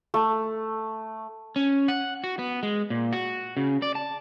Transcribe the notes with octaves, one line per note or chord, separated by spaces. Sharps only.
A3
C#4
F#5
F#4
B3
G#3
A#2
F#4
C#3
D5
A5